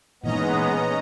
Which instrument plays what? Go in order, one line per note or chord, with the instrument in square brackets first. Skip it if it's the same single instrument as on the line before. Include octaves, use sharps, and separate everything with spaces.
[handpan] A#2 E3 D#4 [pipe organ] G#3 B3 [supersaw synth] C#4 D#5 A#5